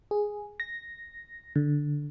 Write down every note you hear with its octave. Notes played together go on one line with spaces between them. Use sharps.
G#4
A#6
D3